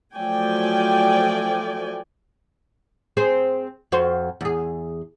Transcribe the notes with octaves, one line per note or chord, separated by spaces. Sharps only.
F3 F#3 A3 D5 G5 G#5
C4 G#4 C5
F2 F#4 C5
E2 G#4